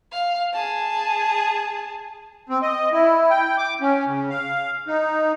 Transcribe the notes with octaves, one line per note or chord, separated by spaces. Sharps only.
F5
G#4 A5
C4
D#5
E4
G5
D6
C#4
C#3
F5
D#4